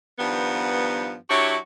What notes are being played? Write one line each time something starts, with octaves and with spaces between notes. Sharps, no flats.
G2 D#3 F3 B3
F#3 D4 E4 F#4 G4 C#5